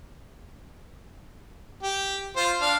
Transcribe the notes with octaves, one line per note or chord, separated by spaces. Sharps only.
G4
F4 C5
D4 F5